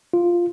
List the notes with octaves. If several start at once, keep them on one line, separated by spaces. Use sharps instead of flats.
F4